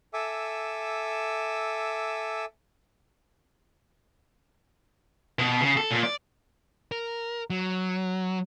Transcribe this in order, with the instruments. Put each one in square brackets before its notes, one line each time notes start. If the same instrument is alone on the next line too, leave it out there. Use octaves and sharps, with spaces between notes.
[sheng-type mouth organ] A4 E5 G#5 D6 E6
[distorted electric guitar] B2
C#3
A4
A#2
D5
[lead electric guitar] A#4
F#3